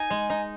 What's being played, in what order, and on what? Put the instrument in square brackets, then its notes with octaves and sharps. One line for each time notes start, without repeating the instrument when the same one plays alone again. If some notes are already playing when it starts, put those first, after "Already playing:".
Already playing: [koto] D#4 [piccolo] G#5
[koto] G#3
D#4